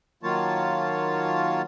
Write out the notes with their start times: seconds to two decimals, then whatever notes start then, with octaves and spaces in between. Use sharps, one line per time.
0.23 D#3 F#3 A#3 F4 C#5 A5